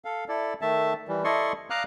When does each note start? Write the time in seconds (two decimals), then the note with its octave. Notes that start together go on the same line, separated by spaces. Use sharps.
0.05 A4 F5
0.28 E4 A4 D5
0.62 D#3 A3 E5 A5
1.08 E3 G3
1.24 E4 A4 D5 D#5 C6 C#6
1.70 F5 A#5 D6 D#6 F6 F#6